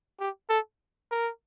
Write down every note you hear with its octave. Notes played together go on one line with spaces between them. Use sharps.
G4
A4
A#4